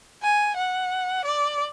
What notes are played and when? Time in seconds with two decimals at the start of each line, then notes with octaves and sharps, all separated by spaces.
0.23 G#5
0.56 F#5
1.25 D5